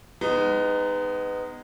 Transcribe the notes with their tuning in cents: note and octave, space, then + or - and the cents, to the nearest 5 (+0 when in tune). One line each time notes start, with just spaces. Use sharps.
G#3 -15 B3 +25 D#4 -10